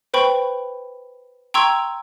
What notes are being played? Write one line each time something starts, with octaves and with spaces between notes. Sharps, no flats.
B4 C5 G5 B5 C#6
G5 A#5 C6 C#6 E6 G#6